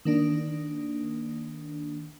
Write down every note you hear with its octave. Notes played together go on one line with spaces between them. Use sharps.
D#3 A#3 D4